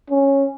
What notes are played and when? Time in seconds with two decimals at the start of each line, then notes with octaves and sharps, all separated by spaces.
0.10 C#4